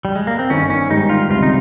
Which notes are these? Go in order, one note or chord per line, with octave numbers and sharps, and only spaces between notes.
G3
G#3
A#3
C4
G1 G2 D#3 C#4
C#4
G#2 D#3 G3 D#4
F4
C#2 C3 G3 F4
D#4